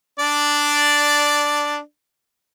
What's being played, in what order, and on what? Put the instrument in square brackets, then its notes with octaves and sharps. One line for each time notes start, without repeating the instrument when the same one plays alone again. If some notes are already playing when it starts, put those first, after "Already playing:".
[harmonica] D4 D5